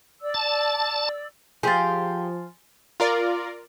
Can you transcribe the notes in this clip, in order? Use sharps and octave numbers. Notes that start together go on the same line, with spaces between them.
D5 E6
A5
F3 G4 G#4 C5 F5 G#5 C6 A6
F4 A#4 D5